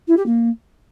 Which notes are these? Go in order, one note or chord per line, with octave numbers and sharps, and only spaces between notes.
E4
G4
A#3